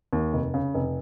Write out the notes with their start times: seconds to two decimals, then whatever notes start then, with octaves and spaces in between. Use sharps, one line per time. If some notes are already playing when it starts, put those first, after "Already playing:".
0.13 D#2
0.33 F1
0.54 C#3
0.74 F1